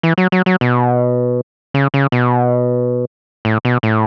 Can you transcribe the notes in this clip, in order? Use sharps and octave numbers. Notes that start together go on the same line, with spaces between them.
E3
F#3
F#3
F#3
B2
C#3
C#3
B2
A2
B2
A2